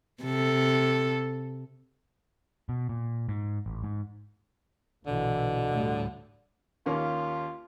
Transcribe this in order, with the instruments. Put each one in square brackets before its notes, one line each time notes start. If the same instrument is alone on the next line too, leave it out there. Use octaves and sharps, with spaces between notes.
[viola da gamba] C3 A4
[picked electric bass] B2
A#2
G#2
A1
G#2
[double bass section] A#1 E3 [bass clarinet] B2 [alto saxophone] D3
[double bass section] D2 A2 G3
[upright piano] D#2 A#3 C#4 [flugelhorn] F4